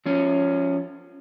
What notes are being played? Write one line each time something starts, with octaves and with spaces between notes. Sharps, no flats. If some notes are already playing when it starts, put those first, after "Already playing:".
F3 C#4